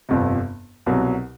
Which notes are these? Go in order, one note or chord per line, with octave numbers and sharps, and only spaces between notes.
G1 F2 C3
C2 B2 F#3